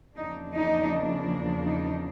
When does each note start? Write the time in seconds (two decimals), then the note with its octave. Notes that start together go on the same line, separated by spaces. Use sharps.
0.16 E2 C#3 F3 A#3 D4 D#4
0.53 D#4
1.65 D#4